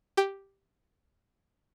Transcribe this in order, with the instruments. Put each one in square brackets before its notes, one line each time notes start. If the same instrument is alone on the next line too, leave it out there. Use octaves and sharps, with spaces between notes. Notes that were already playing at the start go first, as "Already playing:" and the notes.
[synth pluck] G4 G5